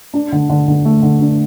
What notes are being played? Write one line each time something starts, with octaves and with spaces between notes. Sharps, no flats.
D4
D3
D3
D3
A3
D3
D4